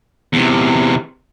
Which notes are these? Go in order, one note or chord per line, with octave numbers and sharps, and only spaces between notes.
E2 C3